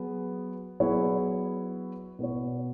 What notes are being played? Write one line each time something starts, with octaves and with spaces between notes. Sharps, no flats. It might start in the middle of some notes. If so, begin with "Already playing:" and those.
Already playing: F#3 B3 G#4
F#3 B3 E4 G#4 C#5
B2 B3 E4 C#5